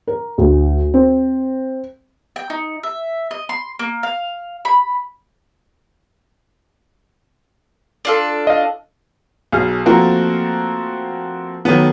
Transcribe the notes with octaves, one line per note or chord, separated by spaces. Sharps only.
A#4
D2
C4
G5
D#4
E5
D#5
C6
A#3
F5
B5
D4 F4 A4
D#5 F5
B1 G#4 F6
F3 A3 A#3 C4 F#4 A#4
D#3 F#3 A3 B3